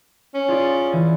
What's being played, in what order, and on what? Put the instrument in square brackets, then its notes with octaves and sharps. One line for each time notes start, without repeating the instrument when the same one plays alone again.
[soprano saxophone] C#4
[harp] F4 G#4 D5
E3